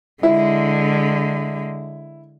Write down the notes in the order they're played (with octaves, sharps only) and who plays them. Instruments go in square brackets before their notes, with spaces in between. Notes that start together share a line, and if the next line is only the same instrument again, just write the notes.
[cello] D3 G#3 [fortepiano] E4